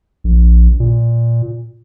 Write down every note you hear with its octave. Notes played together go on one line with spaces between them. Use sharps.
A#1
A#2